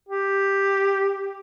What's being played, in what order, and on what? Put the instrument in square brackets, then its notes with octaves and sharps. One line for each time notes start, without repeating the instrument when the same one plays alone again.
[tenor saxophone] G4